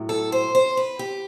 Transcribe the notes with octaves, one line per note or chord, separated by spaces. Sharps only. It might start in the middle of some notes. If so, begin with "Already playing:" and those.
Already playing: A2 F#3
A4
C5
C5
B4
G4